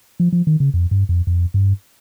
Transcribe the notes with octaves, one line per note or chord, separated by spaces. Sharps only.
F3
F3
D#3
C#3
F2
G2
F2
F2
G2